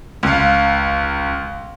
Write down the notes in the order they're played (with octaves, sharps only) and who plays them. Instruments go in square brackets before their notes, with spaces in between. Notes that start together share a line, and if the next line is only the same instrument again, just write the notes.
[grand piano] C#2 F5